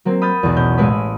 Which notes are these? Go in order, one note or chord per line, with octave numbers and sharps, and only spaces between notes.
F#3 A#3 C4
B5 D#6 F6 G6 A6
B1 E2
B2 C#4 G6
A1 G#3 E4 B4 D#6 B6